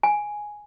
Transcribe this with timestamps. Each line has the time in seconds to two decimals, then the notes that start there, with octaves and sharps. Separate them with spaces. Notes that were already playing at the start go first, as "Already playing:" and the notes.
0.03 G#5